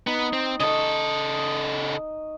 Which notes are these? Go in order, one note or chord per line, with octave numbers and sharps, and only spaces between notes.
B3 D#4
C4
C#3 A4 D#5 C#6